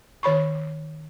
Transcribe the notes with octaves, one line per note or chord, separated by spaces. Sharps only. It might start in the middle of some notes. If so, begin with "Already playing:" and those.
D#3 C#5 B5 C#6